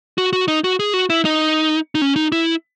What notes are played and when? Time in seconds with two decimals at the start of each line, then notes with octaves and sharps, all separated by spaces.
0.18 F#4
0.33 F#4
0.48 D#4
0.64 F#4
0.80 G#4
0.94 F#4
1.10 E4
1.25 D#4
1.95 D#4
2.02 C#4
2.16 D#4
2.32 E4